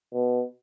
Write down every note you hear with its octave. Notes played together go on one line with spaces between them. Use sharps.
B2